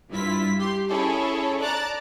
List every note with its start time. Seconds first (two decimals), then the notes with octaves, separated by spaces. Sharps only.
0.10 G2 E4 F4 B6
0.58 G4 C6
0.88 C#4 E4 G#4 A4 C#5 A5
1.59 D5 A5 A#5 D6 F#6 A6